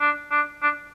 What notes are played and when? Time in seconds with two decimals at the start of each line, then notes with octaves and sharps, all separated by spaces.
0.01 D4
0.31 D4
0.62 D4